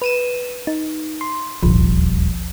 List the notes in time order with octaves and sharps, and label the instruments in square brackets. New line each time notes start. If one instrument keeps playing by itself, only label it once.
[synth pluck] B4 D#7 E7
D#4
C6
[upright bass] D#1 G3 [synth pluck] G#1 D2 F3